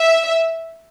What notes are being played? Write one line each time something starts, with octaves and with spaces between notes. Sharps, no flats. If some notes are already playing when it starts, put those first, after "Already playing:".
Already playing: E5